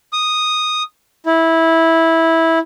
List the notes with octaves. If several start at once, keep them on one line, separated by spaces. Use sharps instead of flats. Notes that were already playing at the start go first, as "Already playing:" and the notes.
D#6
E4